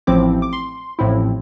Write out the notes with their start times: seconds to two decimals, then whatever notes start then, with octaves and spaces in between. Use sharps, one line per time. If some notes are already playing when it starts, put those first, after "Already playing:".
0.07 A1 A2 F3 C4 E4 D6
0.42 D6
0.53 C6
0.99 A1 A2 F3 C4 E4